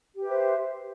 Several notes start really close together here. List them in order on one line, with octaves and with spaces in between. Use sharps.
G4 B4 E5 C5